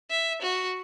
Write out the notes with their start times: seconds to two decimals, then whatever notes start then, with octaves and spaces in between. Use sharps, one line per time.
0.10 E5
0.42 F#4